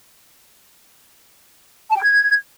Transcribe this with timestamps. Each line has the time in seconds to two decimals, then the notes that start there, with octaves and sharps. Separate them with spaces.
1.90 A5
1.96 G5
2.03 G#6